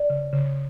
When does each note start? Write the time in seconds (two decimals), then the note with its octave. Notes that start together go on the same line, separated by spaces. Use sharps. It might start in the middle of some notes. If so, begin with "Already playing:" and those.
Already playing: D5
0.10 C#3
0.33 C#3